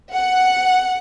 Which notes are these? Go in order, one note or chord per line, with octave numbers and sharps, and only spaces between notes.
F#5